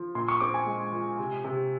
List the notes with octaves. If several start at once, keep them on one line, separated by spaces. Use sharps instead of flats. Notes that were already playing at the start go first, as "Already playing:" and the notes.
Already playing: F3
A#2 C6
C#6
C4 D6
G#5
G#3
F3
C3
C3